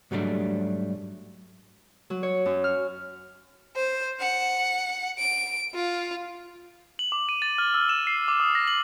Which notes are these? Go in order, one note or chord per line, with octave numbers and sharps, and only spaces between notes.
G#2 F#3 G3 A3 D4
F#3
C#5
F#2
F6
C5
F#5
D7
F4
F#7
D6
D#7
A6
F6
E6
E7
C7
D6
D#6
A#6
F#7